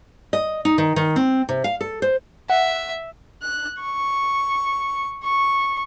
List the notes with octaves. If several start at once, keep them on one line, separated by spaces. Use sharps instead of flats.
D#5
D#4
D#3
D#3
C4
C3
F5
A4
C5
E5 F#5
F#6
C#6
C#6